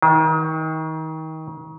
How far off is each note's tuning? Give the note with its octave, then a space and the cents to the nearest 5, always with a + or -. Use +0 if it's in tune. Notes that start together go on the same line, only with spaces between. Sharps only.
D#3 +30